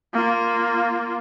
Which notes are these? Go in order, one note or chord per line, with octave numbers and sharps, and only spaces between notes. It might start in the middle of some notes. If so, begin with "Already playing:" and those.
A#3 F4